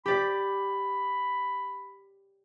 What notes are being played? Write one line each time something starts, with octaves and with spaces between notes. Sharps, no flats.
G4 D5 B5